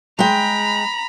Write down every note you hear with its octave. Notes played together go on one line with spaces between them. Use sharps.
G#3 G5 A#5 B5